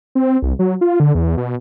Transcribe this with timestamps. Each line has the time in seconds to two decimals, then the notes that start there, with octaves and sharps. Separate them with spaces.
0.15 C4
0.42 C2
0.59 F#3
0.81 F4
1.00 D3
1.15 E2
1.37 B2